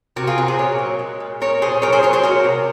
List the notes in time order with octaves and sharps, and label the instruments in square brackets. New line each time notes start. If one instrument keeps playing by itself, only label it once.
[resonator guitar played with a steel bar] C3 F#4 A#4
F4 G#4
C3 F#4 A#4
G#4 C5
A#2 A#4 C#5
F#3
G#3
A#2
G#3 A#4 C#5
A#2 G#4 C5
F#3 A#4 C#5
G#4 C5
F#3 A#4 C#5
G#4 C5
G#3 F#4 A#4
C3